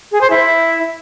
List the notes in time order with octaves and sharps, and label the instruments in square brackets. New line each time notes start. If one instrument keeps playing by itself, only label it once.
[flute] G#4
C5
E4